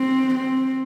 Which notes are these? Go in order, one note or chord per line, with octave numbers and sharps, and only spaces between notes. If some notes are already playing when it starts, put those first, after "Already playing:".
Already playing: C4
C4